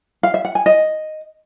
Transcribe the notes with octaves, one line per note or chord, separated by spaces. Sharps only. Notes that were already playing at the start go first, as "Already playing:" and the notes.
F5
E5
F#5
G#5
D#5